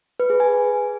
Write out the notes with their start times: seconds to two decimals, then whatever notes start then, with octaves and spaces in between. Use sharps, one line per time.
0.20 B4
0.30 G#4
0.40 G#5